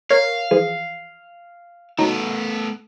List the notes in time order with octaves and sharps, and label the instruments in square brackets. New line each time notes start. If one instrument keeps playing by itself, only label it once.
[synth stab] A#4 C#5 [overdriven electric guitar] F5
[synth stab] E3 F3 G#4
[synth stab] F#3 D#4 [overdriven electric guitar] A3 B3